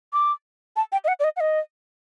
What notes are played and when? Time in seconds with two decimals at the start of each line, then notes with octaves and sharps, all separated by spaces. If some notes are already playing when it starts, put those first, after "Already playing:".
0.13 D6
0.76 A5
0.92 G5
1.04 D#5
1.08 F#5
1.20 D5
1.24 D#5
1.37 F#5
1.40 D#5